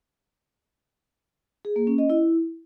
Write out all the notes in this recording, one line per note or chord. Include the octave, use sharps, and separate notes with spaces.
G#4
A#3
C#4
D#5
E4